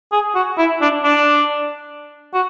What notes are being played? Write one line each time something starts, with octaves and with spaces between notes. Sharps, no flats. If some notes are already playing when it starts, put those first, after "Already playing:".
G#4
F#4
E4
D4
D4
F#4